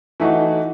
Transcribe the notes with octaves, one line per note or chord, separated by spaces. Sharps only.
E3 A3 D#4 F#4